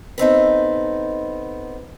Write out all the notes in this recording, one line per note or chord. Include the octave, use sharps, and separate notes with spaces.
B3 C4 D#4 A4